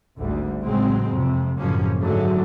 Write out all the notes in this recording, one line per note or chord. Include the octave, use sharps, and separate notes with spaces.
G#1 D2 G3
A1 C#3 F#3 G#3 C4
F2 C3
A1 F#2 C#3 F3 A#3 C#4
G#2 D3 F#3 A3